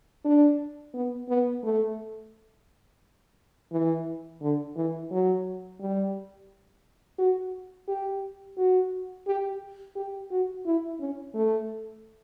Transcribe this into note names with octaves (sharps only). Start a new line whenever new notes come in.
D4
B3
B3
A3
E3
D3
E3
F#3
G3
F#4
G4
F#4
G4
G4
F#4
E4
C#4
A3